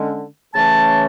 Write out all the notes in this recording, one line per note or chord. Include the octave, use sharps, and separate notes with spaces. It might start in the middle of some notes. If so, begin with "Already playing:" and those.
Already playing: D3 G#3 C#4
C#3 E3 A3 C#4 A5